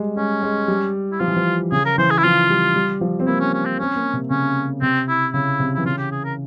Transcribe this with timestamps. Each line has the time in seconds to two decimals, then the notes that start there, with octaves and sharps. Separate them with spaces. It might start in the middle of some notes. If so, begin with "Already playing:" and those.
Already playing: G3 G#3
0.17 G#3 C#4
0.43 G#3
0.68 G3
1.12 E4
1.20 F3 F4
1.28 E3
1.36 F3
1.72 C#3 G#4
1.85 A#4
1.98 E3 C5
2.10 G#4
2.18 E4
2.24 F3 F4
2.50 G3
2.76 G3
3.01 F3
3.20 C4
3.27 A#3 E4
3.40 C#4
3.53 C#4
3.65 C4
3.79 C4 C#4
3.96 A#3
4.13 C3
4.30 C#3 C#4
4.81 C3 C4
5.09 E4
5.33 C#3 E4
5.60 C3
5.75 E3 E4
5.85 C#3 F4
5.98 G4
6.12 G#4
6.24 A#4